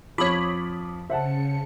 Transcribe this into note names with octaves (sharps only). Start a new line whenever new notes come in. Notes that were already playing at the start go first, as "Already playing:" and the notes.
F2 F3 C#5 B5 D6 D#6
C#3 C5 E5 F#5 A5 C#7